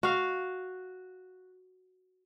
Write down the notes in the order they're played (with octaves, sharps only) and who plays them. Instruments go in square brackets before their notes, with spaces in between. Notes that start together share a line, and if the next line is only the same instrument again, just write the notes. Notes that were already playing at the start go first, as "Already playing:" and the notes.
[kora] F#4 F5